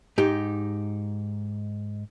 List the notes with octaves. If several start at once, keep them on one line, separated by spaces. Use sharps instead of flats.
G#2 D#4 G4